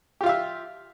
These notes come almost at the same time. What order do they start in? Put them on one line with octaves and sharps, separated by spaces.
G4 F4 F5 E5